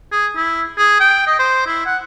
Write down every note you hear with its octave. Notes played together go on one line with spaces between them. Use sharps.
G#4
E4
G#4
G5
D#5
C5
E4
F#5